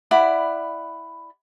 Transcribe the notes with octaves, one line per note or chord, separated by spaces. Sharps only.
E4 D5 F#5 B5